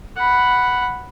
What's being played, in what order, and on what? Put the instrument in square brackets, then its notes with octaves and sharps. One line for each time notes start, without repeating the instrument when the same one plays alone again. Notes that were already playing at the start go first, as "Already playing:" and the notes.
[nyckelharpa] F#5 B5